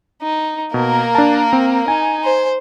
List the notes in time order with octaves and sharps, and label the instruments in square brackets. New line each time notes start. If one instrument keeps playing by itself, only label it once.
[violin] D#4
[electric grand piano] B2 [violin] A#3 A#4
[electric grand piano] D4 A5
C4
[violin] D#4 [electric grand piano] G#5
[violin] C5